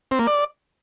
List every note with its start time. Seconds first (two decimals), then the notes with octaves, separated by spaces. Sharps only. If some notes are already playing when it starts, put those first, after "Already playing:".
0.11 C4
0.19 A#3
0.27 D5